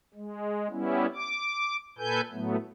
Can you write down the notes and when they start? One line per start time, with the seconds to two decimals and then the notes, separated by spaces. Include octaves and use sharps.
0.14 G#3
0.70 G3 B3 C#4 E4
1.14 D6
1.98 A#2 A4 B4 G#5 G6
2.32 A2 F#3 A3 B3